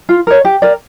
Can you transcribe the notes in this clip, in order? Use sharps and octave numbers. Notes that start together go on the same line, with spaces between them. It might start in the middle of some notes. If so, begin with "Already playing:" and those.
F4
A#4 C#5
G4
A#4 D5